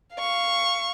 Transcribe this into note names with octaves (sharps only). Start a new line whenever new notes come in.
F5 C#6